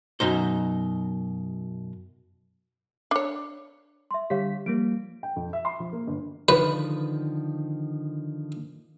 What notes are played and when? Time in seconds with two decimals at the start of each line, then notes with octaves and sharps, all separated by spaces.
0.20 F#2 B2 D#4 C5
3.11 D4 C#5
4.11 E5 C6
4.30 D3 G3 G4 C#5 F5 B6
4.66 F3 G3 A#3 D7
5.23 G5
5.36 F2
5.53 E5
5.65 C6
5.80 F3
5.93 A#3
6.07 G1
6.49 D3 D#3 F3 B4